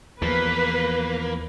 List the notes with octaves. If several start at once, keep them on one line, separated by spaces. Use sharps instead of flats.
E2 F3 A#3 B4